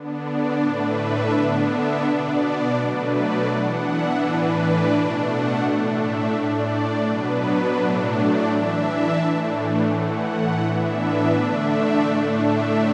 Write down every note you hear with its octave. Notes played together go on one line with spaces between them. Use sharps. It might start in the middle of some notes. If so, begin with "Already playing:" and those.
Already playing: D3 B3 D4
D5
A2 A3 D4 B4
E5
D3 B3 D4
E5
B2 B3 D4 D5
B2 F#3 A3 D4 B4
D5
E3 B3 D4 F#5
E5
A2 E3 D4 B4
D5
B2 A3 D4
F#5
A2 A3 D4
E5
A2 A3 D4 D5
B2 F#3 B3 D4 B4
A2 F#3 A3 D4
D5
E3 D4 E5
A5
A2 E3 A3 D4
A2 E3 A3 F#5
A2 E3 B3 D4 E5
B4
D3 A3 D4 E5
D5
A2 A3 D4
E5